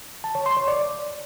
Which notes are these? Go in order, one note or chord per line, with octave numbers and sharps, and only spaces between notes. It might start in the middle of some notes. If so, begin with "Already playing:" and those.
A5
C#5
C6
C#5
D5